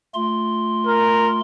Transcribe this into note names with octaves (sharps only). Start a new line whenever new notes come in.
A3 F4 C6
A#4